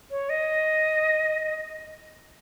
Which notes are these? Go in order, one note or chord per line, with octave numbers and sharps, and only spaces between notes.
C#5
D#5